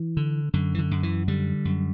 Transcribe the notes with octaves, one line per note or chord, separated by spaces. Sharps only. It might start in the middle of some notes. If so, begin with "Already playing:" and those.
Already playing: E3
D3
F#2 D3
E3
D3
F#2
E3
D3 G3
F#2